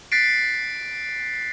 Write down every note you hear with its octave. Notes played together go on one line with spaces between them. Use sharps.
F#6 A6 B6 C7 D7